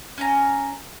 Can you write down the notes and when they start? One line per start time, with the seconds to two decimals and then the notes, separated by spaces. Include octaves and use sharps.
0.18 C#4 G#5 A#5